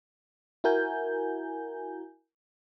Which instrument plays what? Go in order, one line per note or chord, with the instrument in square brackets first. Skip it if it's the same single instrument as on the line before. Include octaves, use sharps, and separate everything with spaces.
[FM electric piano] E4 F#4 A#4 G#5 G6